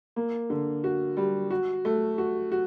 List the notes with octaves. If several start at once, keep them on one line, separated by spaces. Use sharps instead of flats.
A#3
D3
F#4
G3
F#4
A3
F#4
F#4